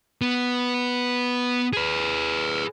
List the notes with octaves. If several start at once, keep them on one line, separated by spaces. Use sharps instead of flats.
B3
G#4 B4